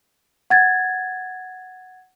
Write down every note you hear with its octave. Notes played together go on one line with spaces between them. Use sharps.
F#5 G#6 A6